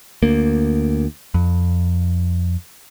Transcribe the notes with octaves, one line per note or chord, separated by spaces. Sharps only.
D2 A#3
F2